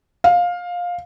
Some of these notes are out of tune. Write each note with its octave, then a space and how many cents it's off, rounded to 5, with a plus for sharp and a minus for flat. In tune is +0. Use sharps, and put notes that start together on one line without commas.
F5 +15